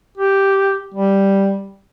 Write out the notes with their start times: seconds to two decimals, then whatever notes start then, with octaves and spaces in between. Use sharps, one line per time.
0.17 G4
0.94 G3